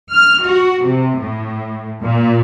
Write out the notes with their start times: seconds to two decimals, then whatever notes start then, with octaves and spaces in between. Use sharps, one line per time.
0.12 F6
0.44 F#4
0.85 C3
1.20 A2
2.02 A#2